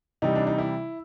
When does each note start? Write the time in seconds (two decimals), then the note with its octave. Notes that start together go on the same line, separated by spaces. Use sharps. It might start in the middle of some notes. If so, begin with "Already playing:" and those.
0.22 C3 E3 G3 D#4
0.36 D4
0.47 D#4
0.58 E4